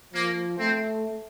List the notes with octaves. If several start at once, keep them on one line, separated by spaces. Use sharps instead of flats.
F3 A#3
A3 C4